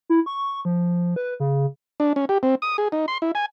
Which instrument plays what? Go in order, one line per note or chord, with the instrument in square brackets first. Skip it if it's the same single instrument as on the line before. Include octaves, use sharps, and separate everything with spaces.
[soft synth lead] E4
C#6
F3
B4
C#3
[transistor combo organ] D4
C#4
G4
C4
D#6
G#4
D#4
C6
E4
G#5